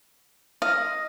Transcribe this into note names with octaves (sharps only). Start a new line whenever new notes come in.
D#5 F5